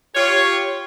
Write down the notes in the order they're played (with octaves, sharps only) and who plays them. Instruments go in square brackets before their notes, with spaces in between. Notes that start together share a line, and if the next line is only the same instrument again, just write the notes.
[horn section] F4 G4 C#5